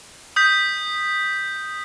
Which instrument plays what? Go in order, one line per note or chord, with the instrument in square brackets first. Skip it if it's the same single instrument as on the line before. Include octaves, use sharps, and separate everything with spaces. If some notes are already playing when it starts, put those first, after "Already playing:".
[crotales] D#6 G6 B6